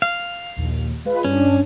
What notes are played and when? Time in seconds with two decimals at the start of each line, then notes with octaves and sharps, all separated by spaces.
0.02 F5
0.56 A#1 D#2
1.05 G#3 F4 B4
1.25 G2 C#4 D4